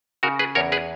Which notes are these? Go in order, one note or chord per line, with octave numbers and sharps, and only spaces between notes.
C#3 F#4 A#4
G#4 B4
E2 A#4 C#5
G#4 B4